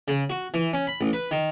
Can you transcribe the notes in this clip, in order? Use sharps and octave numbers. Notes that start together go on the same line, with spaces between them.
C#3
F#4
E3
C#4
B5
A1
B4
D#3